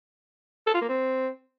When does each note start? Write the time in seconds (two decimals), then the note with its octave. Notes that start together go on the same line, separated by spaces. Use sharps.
0.67 A4
0.74 F4
0.81 A#3
0.89 C4